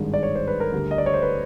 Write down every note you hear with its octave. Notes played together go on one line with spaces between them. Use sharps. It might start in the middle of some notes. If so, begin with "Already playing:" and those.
Already playing: G#1 G2 D#3 G#3
D5
C#5
C5
B4
A#4
D2 D3 G3
D#5
D5
C#5
C5
B4